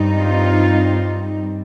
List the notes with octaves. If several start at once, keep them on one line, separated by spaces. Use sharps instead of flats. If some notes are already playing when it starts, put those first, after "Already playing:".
Already playing: G2 G3 C4 D#4
F4